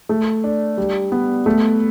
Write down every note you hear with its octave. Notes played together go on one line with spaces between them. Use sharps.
A3
D4
G3
B3
A3